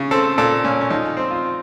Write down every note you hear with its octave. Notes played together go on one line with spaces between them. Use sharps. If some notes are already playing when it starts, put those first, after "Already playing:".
Already playing: C#3
C4 A4
A#2 A4
A#2 C#4
C#4
F3 D#4
C4
F4